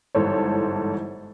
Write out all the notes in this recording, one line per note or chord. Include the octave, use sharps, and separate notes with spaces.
G1 G#2 E3 A4 C5 C#5